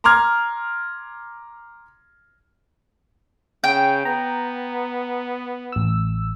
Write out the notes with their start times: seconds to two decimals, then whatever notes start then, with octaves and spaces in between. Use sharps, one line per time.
0.04 A#5 C6 D6 F6 G#6
3.64 C#3 G5
4.05 B3 A#5
5.72 A1 E6